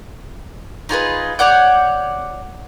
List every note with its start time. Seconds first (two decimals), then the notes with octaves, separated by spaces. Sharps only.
0.89 D#4 F4 G#4 B4
1.39 C#5 D5 F#5 G6